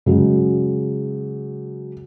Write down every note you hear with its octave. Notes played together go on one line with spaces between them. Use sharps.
C#3 F#3 G#3